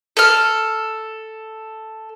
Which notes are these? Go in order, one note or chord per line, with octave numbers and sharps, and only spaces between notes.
A4 F6